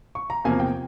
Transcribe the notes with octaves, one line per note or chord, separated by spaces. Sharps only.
C#6
A#5
E2 C3 F3 A#3 G#5
G5